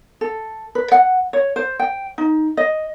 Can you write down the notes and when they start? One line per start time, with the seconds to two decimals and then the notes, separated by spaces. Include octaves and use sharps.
0.21 A4
0.75 B4
0.92 F#5
1.33 C#5
1.56 C5
1.79 G5
2.18 D#4
2.57 D#5